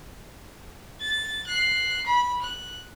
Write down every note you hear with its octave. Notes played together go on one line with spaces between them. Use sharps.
A6
F#6 C7
B5
F#6